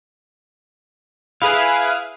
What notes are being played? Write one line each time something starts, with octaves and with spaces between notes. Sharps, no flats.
E4 G#4 B4 F5